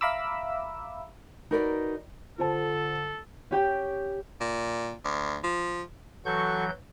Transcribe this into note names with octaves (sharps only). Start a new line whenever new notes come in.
E5 F5 A#5 B5 D6 E6
D#4 F#4 A#4 B4 C#5 D5
D3 F4 A4 C5 A5
C#4 G4 G5
A#2
D2
F3
E3 F#3 F#4 A4 C#6 G6